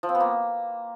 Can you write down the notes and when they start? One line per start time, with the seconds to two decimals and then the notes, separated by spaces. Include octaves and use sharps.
0.03 F3
0.09 C4
0.15 B3
0.20 A#3